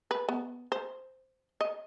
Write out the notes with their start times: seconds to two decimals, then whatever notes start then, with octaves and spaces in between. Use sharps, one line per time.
0.11 B4
0.29 B3
0.72 C5
1.61 D#5